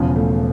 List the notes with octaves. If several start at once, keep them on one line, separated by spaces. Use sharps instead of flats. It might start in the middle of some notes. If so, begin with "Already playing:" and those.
Already playing: E1 E2 C#3 F3
A3